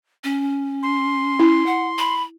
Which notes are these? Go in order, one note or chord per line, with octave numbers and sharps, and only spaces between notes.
C#4
C6
E4
F#5
B5